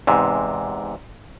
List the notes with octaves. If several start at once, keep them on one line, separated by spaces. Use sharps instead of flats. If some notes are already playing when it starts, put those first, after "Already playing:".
E2 G#2 C3